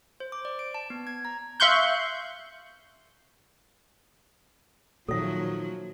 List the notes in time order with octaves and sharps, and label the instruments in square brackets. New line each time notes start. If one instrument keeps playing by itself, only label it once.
[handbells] C5
D6
D5
D7
A5
B3
G#6
A#5
[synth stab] E5 F5 C6 C#6 F#6 G6
[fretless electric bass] A#2 D#3 [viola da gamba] F3 F#3 [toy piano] A4 E5